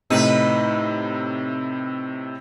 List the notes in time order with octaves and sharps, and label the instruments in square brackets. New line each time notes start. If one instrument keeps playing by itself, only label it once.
[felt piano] A2 C3 [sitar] D#4 B4